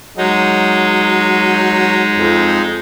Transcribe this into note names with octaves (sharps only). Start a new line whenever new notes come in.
F#3 G#3 D#4
F2